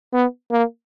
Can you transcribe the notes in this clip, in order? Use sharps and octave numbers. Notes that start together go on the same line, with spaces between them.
B3
A#3